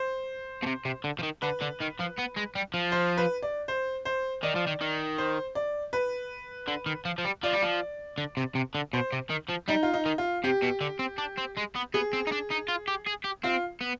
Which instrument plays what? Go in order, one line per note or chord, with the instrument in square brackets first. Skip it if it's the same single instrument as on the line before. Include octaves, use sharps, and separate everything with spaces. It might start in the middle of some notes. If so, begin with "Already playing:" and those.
Already playing: [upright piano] C5
[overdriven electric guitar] B2
C3
C3
D3
F3
D#3
[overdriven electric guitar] D3 [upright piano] B4
[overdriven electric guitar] D3
D#3
F3
B3
G#3
G3
F3
[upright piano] C5
B4
D5
C5
C5
[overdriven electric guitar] D#3 [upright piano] D5
[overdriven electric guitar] F3
D#3
D#3
[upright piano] C5
D5
B4
[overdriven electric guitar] D3
D#3
F3
F3
G3
[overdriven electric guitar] F3 [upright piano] D5
[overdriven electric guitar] G3
F3
D3
C3
C3
D3
[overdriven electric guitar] B2 [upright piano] C5
[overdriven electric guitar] C3
D#3
F3
[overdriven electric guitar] G3 [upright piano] D#4
[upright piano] F4
D#4
[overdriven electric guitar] D#3
[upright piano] F4
[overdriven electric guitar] C3 [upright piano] G4
[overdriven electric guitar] B2
D3
C4
D4
C4
G#3
B3
[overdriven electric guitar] B3 [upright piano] G#4
[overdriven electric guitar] C4
D#4
D4
D#4
F4
G4
G#4
G4
[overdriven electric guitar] C4 [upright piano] F4
[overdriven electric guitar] B3